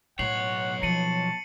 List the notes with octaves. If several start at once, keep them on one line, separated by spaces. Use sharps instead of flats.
B1 A2 C#5 F#5 C7 F#7
F3 A5 C#7 D#7 F#7